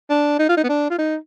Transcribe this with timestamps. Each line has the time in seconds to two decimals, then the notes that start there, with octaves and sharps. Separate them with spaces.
0.10 D4
0.39 D#4
0.49 F4
0.57 D#4
0.64 B3
0.69 D4
0.90 F4
0.98 D#4